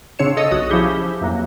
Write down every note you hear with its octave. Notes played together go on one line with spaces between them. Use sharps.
C#3 C4 D4 C#5 C#7 E7
A4 C#5 D#5 D#6 E6
B1 F#4 D#6
F3 C#4 E4 G4 G#4
F2 E3 F#3 A#3